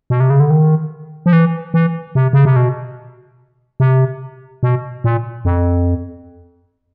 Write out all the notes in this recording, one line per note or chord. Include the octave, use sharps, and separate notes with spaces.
B2
C3
C#3
D3
D#3
F3
E3
E3
C3
C#3
C3
B2
C3
B2
A#2
F2